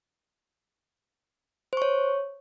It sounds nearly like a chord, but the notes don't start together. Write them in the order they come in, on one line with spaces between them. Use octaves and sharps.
C5 C#6 C#5